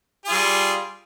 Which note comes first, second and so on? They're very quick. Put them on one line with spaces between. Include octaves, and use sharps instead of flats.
G#4 F4 G3